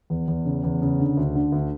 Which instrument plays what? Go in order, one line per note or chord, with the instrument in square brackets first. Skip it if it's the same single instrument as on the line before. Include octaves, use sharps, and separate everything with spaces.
[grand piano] E2
E2
C#3
E2
C#3
D3
D2
D3
D2